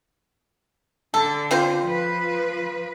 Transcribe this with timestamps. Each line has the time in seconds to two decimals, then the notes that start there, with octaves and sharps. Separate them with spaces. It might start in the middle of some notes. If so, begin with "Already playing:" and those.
1.14 D3 A4
1.51 C4 F4 C5
1.84 F3 B4